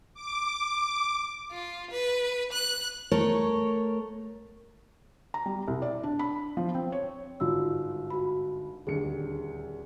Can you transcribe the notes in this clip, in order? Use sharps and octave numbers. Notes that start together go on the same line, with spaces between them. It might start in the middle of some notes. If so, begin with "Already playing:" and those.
D6
F4
B4
F#6
A3 A#4 C#5
A#5
G3
C2
D5
D4
B5
F3
C4
C#5
G1 G#2 F4 F#4 E6
F#4 B5
D#1 D2 G#4 C#7